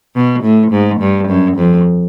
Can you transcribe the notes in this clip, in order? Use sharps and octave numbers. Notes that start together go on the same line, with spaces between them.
B2
A2
G#2
G2
F#2
F2